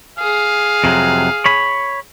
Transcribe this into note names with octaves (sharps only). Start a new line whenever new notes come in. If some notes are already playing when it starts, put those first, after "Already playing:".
G#4 F5
F2 C3 F#3
C#5 B5